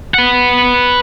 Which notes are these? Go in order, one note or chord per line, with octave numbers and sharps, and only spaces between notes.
B4 F#5